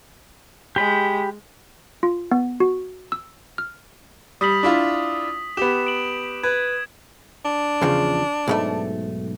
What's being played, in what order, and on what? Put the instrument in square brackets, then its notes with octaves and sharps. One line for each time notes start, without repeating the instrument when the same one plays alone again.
[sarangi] G#3 [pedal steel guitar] G4 B5
[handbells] F4
B3
F#4
E6
F6
[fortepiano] G3 [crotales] D#6 B6 F#7
[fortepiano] D4 E4 F4
[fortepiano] B3 G4 [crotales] E7
[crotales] D7 F#7
[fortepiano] B4 [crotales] G#6
[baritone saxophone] D4
[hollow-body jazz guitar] E2 C#3 F3
B1 G#2 A3